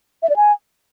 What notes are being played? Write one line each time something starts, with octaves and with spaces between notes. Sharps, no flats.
E5
D5
G#5